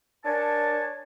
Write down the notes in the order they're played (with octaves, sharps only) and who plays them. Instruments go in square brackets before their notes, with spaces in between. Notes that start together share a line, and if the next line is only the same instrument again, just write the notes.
[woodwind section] D4 A#4 C#5 G#5 A5